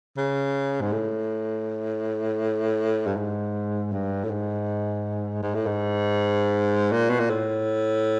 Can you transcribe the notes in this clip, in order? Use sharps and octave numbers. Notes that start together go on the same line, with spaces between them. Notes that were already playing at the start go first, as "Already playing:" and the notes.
C#3
G#2
A2
G2
G#2
G2
A2
G#2
G#2
A2
G#2
A#2
B2
A#2
A2